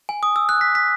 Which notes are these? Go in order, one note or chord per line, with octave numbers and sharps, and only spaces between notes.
G#5
D#6
E6
F#6
B6
B6